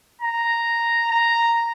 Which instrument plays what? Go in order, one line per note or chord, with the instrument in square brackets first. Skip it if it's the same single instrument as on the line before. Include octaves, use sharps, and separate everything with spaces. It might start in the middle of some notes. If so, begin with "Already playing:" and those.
[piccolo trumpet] A#5
A#5